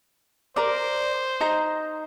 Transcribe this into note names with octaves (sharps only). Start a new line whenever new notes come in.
A#4 C5 D5
D#4 A#5